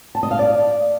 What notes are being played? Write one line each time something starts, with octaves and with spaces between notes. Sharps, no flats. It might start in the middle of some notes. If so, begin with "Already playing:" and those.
A5
D#5
F5
D5